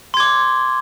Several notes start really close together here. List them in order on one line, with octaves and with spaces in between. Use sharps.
C6 G#6 D6